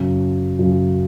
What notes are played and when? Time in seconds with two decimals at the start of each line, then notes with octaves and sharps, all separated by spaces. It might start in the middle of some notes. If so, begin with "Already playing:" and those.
Already playing: F#2 C#3 F#3
0.59 F#2 C#3 F#3